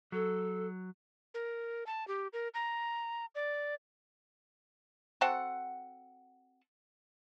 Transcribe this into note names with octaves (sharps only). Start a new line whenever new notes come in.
F#3 A4
A#4
A5
G4
A#4
A#5
D5
C4 F#4 A4 F#5